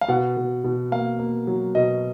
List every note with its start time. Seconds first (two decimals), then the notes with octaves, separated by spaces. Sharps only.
0.01 F5
0.08 B2 F#5
0.37 B2
0.64 B2
0.92 A#3 F5
1.19 A#3
1.47 F#3
1.75 B2 D#5